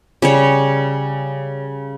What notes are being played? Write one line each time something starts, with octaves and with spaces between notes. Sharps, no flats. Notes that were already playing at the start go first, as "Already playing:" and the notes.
C#3 G3 C#5